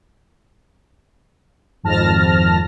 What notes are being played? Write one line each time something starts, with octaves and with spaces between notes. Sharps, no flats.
G#1 F2 A5 F6 A#6